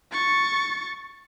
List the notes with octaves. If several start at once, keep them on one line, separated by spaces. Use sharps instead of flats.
C#6 A6